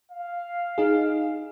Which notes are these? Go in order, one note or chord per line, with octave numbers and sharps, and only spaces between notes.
F5
D#4 G#4